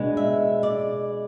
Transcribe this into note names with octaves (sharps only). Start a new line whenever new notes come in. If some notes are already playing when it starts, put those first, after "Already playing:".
Already playing: B2 G#3 D4
E5
D5